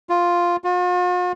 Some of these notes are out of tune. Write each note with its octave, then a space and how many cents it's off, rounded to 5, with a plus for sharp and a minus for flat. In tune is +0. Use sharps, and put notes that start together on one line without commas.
F4 +0
F4 +45